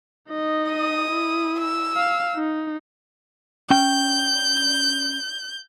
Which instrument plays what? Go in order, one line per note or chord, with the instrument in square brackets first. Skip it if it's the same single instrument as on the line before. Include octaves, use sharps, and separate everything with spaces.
[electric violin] D#4 D#5
[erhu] D#6
[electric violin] E4
[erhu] E6
[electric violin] F5
D#4
[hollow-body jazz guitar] C#4 G5 [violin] G6